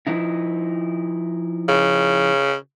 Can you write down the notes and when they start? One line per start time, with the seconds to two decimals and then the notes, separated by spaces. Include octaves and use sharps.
0.07 F3 D#4 E4
1.69 C#3